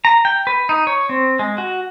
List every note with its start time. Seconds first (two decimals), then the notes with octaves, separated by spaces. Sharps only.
0.05 A#5
0.25 G5
0.47 B4
0.69 D#4
0.87 C#5
1.09 C4
1.39 G#3
1.58 F#4